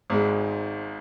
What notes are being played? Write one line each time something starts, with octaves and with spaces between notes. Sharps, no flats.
G#1 G#2 G#3